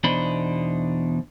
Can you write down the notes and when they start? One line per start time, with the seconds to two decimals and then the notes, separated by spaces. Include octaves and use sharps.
0.04 E2 B2 D4 D#4 C5 B5